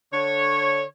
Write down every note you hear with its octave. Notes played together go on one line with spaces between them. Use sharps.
D3 C#5